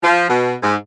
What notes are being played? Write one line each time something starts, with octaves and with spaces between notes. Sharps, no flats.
F3
B2
G#2